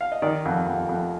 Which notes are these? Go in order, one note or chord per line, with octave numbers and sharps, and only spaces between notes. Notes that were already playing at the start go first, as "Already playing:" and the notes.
F5
D#5
D#3 D5
F2
F2
F2